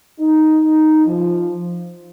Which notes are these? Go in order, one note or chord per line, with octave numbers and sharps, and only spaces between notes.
D#4
F3